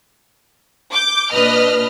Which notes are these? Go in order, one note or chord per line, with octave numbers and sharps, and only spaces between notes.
D6 G6
A#2 D4 B4 D#5 F6